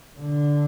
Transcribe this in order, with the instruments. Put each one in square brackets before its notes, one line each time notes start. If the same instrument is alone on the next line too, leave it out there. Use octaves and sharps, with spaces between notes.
[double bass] D3